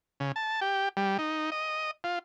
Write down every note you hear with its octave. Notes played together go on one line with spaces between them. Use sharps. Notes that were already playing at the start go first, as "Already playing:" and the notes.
C#3
A5
G4
G3
D#4
D#5
F4